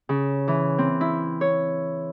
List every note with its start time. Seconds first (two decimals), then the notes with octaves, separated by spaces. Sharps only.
0.09 C#3
0.48 E3
0.78 C4
1.01 E4
1.41 C#5